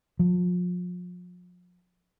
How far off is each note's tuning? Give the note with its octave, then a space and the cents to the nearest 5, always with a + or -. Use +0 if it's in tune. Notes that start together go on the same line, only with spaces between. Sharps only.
F3 +35